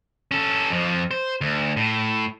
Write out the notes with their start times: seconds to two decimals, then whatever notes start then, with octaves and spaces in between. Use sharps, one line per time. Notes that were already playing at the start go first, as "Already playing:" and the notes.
0.31 C#4 A4
0.70 F2 F3
1.11 C5
1.41 D2
1.77 A2